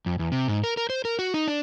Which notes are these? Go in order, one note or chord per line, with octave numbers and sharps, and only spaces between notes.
F2
E2
C3
G#2
A#4
A#4
C5
A#4
F#4
D#4
D4